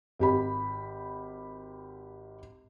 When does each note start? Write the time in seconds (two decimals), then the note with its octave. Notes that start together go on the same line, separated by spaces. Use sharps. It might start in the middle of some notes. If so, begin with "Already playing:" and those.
0.19 G#1 G4 B5